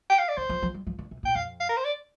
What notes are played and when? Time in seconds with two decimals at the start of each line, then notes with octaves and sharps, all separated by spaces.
0.10 G5
0.19 F5
0.29 D5
0.37 D3 C5
0.49 F3
0.63 F3
0.74 G3
0.87 F3
0.99 D3
1.11 C3
1.23 A#2 G5
1.35 F2 F5
1.60 F5
1.69 A#4
1.77 C5
1.85 D5